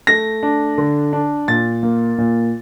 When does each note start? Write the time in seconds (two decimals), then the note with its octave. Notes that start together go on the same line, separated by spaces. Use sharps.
0.07 A3 A#6
0.43 D4
0.78 D3
1.13 D4
1.48 A#2 A6
1.83 A#3
2.18 A#2